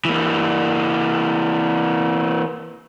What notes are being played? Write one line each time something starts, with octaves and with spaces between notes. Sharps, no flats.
E3 A#3